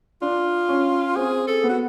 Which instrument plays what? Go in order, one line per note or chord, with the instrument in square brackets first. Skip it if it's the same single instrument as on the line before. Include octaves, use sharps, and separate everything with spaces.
[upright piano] D4 [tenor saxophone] F4
[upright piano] C#4
[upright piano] C4 [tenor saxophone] G#4
[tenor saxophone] A4
[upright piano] B3
[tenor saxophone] F#4